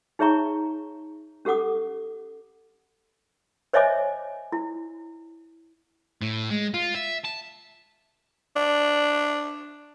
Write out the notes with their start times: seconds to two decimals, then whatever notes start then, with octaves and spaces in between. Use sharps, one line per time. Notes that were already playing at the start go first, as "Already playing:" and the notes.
0.19 D#4 G#4 C#5 E5 A#5 C#6
1.45 C#4 G4 A4 F#5 D6 D#6
3.73 C5 C#5 D#5 E5 G#5 D6
4.52 E4
6.22 A2
6.51 G#3
6.74 F4
6.94 E5
7.24 A5
8.56 D4